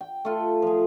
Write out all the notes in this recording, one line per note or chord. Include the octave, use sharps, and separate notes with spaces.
G5
A3 F4
F3 G#4